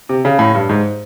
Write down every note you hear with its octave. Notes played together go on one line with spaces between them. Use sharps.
C3
C#3
A2
G2
G#2